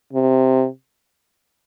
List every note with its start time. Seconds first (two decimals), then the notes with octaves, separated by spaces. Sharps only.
0.13 C3